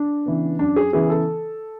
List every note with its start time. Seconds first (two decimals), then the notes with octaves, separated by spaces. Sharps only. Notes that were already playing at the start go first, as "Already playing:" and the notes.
Already playing: D4
0.26 C#3 E3 B3
0.59 F#2 D4
0.76 G#4
0.93 C#3 E3 B3 G#4
1.10 A4